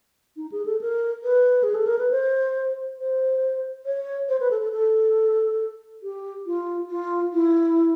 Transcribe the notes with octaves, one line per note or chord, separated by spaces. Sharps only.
D#4
G#4
A4
A#4
B4
G#4
A4
A#4
B4
C5
C5
C#5
C5
B4
A4
A4
A4
G4
F4
F4
E4